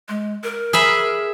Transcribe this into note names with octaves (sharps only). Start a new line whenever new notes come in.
G#3
A#4
G#4 E5 B5